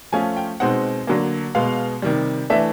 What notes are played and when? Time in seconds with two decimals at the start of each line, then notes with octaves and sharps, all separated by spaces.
0.12 F3 A3 C#4 F4 G#5
0.37 G5
0.60 B2 G#3 C4 D#4 F#5
1.07 D3 F#3 A#3
1.55 B2 G#3 B3 F5
2.02 C3 D#3 G3
2.50 E3 A3 D4 E5